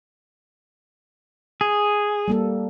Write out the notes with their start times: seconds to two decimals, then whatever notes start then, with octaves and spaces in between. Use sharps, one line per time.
1.61 G#4
2.28 G3 A#3 A4